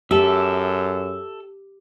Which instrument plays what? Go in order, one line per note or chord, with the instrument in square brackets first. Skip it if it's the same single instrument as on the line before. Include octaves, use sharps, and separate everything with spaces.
[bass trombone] F#2 [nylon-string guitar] G4 [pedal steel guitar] A4 E5